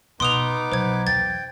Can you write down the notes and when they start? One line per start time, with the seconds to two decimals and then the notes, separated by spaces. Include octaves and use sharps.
0.20 B2 B3 D#4 C6 D6 D#6 F7
0.72 B1 C5 G#6
1.07 E2 G5 G#6 A6